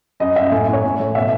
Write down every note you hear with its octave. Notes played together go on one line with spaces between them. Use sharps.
F#2 D#5
F#2 E5
A2 G#5
A2
C#5
A2
A2
B2 E5